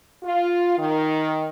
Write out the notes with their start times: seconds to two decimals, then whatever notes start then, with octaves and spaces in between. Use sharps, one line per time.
0.24 F4
0.78 D#3